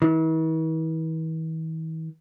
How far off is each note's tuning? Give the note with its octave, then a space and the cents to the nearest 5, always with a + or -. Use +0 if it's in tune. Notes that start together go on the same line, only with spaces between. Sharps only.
E3 -45